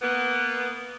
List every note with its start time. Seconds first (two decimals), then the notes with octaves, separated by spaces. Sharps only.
0.02 A#3 B3